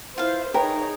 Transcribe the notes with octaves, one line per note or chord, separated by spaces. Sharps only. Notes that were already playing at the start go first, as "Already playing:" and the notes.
E4 F4 B4 C5 F5
D#4 G#4 A#4 B4 C#5 E5 G5